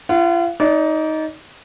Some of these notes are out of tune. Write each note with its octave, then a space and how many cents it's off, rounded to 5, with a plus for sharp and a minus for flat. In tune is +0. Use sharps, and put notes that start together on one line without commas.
F4 -40 F#5 +0
D#4 +10 D5 -25